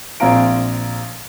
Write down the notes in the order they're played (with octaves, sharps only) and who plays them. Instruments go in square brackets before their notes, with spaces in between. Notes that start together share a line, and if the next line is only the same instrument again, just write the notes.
[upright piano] A#1 C4 F5 A#5 D7